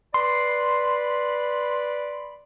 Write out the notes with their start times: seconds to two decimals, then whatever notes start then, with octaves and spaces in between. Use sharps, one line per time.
0.14 B4 D5 B5 C6